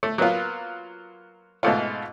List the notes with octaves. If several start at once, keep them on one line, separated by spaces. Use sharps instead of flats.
A3
F#3 A#3 B3 F4
G#2 B2 A3 F4